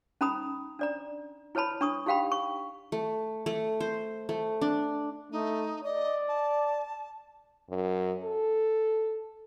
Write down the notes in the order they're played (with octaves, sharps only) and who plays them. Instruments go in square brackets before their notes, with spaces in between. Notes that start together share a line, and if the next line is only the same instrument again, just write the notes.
[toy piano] C#4 D#4 A#5 B5 D#6
D4 D5 A#5
E4 B4 C#5 A5 B5
D4 C#6 D#6
D#4 G4 F5 G5 B5
C#6
[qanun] A3
A3
C5
A3
D4
[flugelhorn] A3 [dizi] D#4
[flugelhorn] D5 [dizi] D#5
[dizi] A5
[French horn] F#2
A4